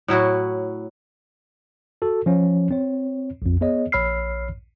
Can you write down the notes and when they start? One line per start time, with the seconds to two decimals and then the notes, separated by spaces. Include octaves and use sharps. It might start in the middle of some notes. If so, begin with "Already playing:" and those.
0.08 A2 F#3 E4 F#4
2.02 F#4 A4
2.26 F3 C#4 C#5
2.71 C4 C#5
3.42 A#1 F2
3.61 B3 G#4 C#5 D#5
3.92 A#1 C#5 B5 E6 F6 C7